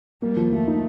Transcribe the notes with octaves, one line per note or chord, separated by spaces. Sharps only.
G3 A#3
F3
F3 A3
D#4